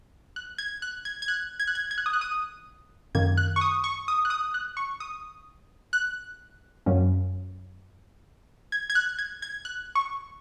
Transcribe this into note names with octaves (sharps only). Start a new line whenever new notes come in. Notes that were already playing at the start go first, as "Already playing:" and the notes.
F#6
G#6
F#6
G#6
G#6
F#6
G#6
F#6
G#6
G#6
F#6
D#6
F#6
D#6
F#2 D#3 A#3 G#6
F#6
C#6
D#6
C#6
D#6
F#6
D#6
F#6
C#6
D#6
F#6
F#2 F#3 A#3 C#4
G#6
G#6
F#6
G#6
G#6
F#6
C#6